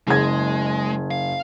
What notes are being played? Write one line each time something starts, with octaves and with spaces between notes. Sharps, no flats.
F#1 G#3 G#6
F5